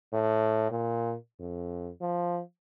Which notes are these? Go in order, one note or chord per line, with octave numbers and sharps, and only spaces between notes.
A2
A#2
F2
F3